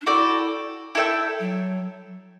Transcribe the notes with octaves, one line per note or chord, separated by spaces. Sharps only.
D4
E4 F#4 A4 D5 G5
E4 A4 E5 G5
F#3